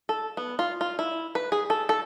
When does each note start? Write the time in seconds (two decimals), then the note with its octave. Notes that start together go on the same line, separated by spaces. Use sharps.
0.09 A4
0.37 B3
0.59 F4
0.81 F4
0.99 E4
1.35 B4
1.52 G#4
1.70 A4
1.89 A4